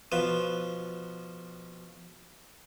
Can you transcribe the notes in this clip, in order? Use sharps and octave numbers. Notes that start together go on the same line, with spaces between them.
B2 F3 B4